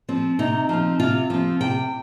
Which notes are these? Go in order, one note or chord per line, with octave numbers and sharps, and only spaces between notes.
F3 C4
C3 D#4
F3 C4
C3 F4
F3 C4
C3 G5